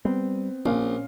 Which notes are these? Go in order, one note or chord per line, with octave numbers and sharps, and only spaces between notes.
G3 B3 C4
A#1 A#2 C#4 F5